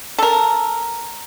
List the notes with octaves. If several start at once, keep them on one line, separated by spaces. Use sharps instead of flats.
A4 A#4